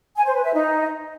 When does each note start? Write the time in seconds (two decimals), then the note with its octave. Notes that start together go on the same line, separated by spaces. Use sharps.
0.16 G#5
0.26 C5
0.35 B4
0.44 E5
0.53 D#4